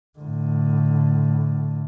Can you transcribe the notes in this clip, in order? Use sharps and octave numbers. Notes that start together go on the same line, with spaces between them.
A2 D3